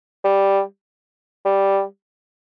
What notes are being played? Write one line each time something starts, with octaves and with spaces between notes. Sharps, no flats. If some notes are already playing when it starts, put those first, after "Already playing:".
G3
G3